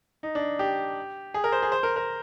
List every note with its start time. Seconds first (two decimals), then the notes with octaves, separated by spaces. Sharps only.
0.23 D#4
0.35 D4
0.59 G4
1.34 G#4
1.44 A#4
1.52 C5
1.63 G#4
1.72 C5
1.83 A#4
1.96 A#4